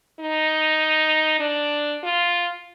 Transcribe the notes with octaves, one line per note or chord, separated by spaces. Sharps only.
D#4
D4
F4